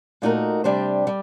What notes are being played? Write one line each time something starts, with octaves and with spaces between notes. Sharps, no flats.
A#2 A3 D#4 F#4 A#4
C3 G3 D4 G4 C5
G3